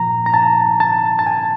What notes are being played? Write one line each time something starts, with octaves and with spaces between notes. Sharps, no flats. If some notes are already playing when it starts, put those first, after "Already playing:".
Already playing: A#2 F3 A#5
A#5
A5
A5
A5
G#5